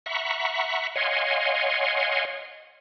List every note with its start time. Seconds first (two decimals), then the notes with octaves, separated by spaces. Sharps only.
0.06 E5 F#5 A#5 B5 C#6
0.96 C#5 D#5 F5 F#5 G#5 C6